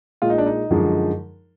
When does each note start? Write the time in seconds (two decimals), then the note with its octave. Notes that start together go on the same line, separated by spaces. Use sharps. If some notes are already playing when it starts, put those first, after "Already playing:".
0.22 A#2 G#3 F4
0.30 D#4
0.38 D4
0.46 D#4
0.71 F#2 D3 F3 G#3